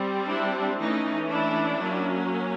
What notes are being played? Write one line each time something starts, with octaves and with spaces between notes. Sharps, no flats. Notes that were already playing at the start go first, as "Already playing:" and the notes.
Already playing: G3 C4
D4 E4
E3 A3 C#4 D#4
D4 E4
F#3 A#3 C#4